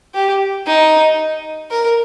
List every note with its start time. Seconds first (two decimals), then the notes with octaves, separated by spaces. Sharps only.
0.15 G4
0.67 D#4
1.71 A#4